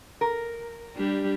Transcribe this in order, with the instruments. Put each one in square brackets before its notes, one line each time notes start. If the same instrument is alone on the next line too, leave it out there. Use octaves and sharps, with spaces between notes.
[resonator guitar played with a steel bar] A#4
[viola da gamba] G3 D4 G4